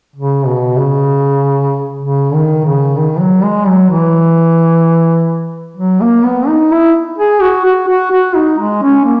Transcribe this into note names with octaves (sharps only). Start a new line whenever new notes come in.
C#3
B2
C#3
C#3
D#3
C#3
D#3
F#3
G#3
F#3
E3
F#3
A#3
B3
D#4
E4
G#4
F#4
F#4
F#4
F#4
D#4
G#3
C#4
A#3